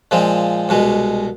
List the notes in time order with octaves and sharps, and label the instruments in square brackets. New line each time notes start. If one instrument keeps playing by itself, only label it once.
[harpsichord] A#2 F3 G#3 C4
C2 B2 G#3